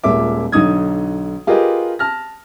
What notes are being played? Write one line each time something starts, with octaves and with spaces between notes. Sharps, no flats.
D#1 A#2 G#3 A#3 E5 D6
B1 D3 D#4 D#6 G#6
F4 G4 G#4 A#4 B4 D#5
A5 F6 A#6